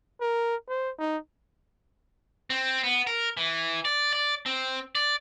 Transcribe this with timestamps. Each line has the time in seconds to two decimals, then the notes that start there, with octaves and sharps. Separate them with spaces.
0.21 A#4
0.68 C5
0.99 D#4
2.50 C4
2.84 B3
3.07 A#4
3.37 E3
3.85 D5
4.13 D5
4.46 C4
4.95 D5